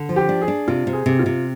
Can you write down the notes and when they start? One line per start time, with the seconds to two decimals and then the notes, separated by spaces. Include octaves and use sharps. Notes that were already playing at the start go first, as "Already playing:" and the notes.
Already playing: D3
0.09 F3
0.16 G4
0.29 D4
0.42 G#4
0.48 D4
0.68 C3 F4
0.87 C3
0.93 G#4
1.06 C3
1.19 F4
1.26 C3